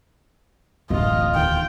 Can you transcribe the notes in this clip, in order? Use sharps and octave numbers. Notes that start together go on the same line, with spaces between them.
D1 A1 F#2 A2 F4 D#5
E2 D#3 G5